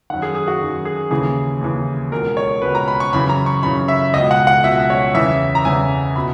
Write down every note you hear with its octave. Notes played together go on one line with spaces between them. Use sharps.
F#2 D#3 F#5
G#4
G#4
F#4
F#2 D#3
G#4
D#2 C#3 E3 G#4
D#2 C#3 E3
C#2 B2 A#4
C#5
C#2 B2 B4
A#5
B5
C#6
F#2 C#3 E3 B5
A#5
C#6
F#2 C#3 E3 B5
E5
C#2 B2 D#5
F#5
F#5
C#2 B2 E5
C#5
E2 C#3 E3 E5
A#5
E2 C#3 E3 G#5
B2 B5